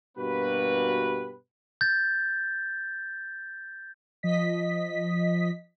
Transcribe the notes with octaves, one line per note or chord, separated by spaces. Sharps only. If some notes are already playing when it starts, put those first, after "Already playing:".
G2 B2 A#3 F#4 G4 B4
G6 A6
F3 D#5 B6